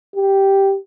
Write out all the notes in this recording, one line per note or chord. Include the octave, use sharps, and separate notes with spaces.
G4